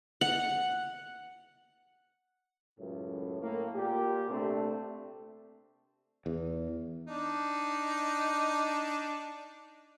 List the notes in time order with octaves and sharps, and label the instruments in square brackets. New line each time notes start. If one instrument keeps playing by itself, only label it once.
[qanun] F#5
[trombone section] C#2 F#2 A2
A2 A#3
A#2 G4
C3 A3 C4 D4
[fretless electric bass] E2
[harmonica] D4 D#4